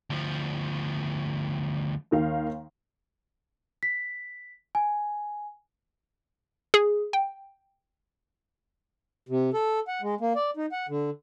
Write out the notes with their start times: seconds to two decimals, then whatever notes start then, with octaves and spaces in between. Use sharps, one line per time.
0.10 D2 F3
2.11 D#2 D#3 F5
3.83 B6
4.75 G#5
6.74 G#4
7.13 G5
9.29 C3
9.54 A4
9.88 F#5
10.02 G#3
10.21 A#3
10.35 D5
10.57 D#4
10.72 F#5
10.89 D3